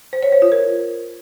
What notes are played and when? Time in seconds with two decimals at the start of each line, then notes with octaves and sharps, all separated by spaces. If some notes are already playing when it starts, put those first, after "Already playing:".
0.13 C5
0.23 C#5
0.32 C5
0.42 F4
0.52 A#4